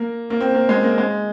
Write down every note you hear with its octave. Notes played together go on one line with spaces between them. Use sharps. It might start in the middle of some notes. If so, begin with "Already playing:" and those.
Already playing: A#3
A#3
C4
A#3
G#3
A#3
G#3